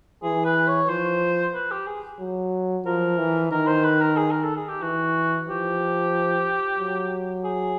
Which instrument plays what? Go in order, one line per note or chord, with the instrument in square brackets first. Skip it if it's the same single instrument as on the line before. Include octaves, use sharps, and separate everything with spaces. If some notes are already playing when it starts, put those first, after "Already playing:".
[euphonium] E3 [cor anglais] G#4
[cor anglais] B4
C#5
[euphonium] F3 [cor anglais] C5
[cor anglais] B4
G4
G#4
[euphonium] F#3
[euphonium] F3 [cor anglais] A#4
[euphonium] E3
[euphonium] D#3 [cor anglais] A#4
[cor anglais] C5
B4
A#4
G#4
A#4
A4
G#4
G4
[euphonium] E3 [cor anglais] F#4
[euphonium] F3 [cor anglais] G4
[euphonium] F#3
[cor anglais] G#4